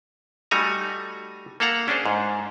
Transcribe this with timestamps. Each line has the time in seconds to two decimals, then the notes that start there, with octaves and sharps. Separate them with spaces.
0.51 G3 A3 D#4 F#4 G#5 A#5
1.60 A#3 A4 F5 F#5 A#5
1.88 C#4 D4 G#4 C5
2.06 G#2